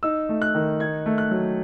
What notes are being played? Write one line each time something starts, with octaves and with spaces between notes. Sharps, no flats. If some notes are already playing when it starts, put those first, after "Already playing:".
D#4 E6
A3
F#6
D#3
D#4 G#6
A3
F#6
F#3